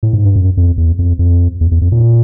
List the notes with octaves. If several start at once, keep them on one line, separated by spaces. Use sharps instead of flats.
A2
G#2
G2
F#2
F2
E2
F2
F2
E2
E2
F2
A#2